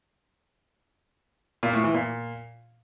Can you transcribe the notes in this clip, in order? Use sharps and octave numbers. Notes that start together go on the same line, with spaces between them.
A#2
A2
E3
A#2